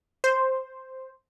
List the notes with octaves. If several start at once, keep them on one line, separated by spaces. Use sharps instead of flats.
C5